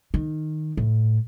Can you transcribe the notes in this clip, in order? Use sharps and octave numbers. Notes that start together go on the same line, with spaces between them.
D#3
A2